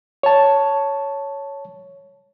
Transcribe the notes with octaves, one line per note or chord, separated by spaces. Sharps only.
C#5 A5